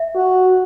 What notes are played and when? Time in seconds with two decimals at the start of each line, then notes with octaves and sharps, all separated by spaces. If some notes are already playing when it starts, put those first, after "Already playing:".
Already playing: E5
0.15 F#4